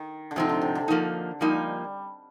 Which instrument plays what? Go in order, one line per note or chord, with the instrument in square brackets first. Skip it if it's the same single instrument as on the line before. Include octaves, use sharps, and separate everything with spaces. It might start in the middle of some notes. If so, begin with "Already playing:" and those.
Already playing: [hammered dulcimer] D#3
D3
[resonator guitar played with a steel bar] G#2 F3 C4 D#4 [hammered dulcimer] C3
[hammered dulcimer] D3
C3
D3
[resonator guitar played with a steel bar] F3 A#3 D#4
[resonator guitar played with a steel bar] F3 A#3 D#4 [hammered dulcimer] G3